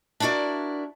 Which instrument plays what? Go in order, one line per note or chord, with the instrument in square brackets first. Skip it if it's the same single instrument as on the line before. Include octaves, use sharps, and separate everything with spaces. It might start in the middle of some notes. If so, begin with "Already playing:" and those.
[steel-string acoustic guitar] D4 E4 F#4 A#4 D5